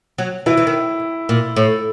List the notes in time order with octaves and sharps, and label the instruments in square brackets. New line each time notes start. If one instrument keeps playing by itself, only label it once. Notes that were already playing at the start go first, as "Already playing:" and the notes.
[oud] F#3
[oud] E3 [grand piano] E4
[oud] E3
D#3
A#2
A2